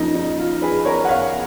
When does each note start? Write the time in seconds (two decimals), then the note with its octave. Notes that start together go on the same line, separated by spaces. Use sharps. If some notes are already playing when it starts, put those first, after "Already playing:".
Already playing: F2 F3 A#3 C#4 D#4
0.15 D#4
0.39 F4
0.62 G#4 B4
0.85 A#4 C#5
1.05 F#5
1.08 C#5 F5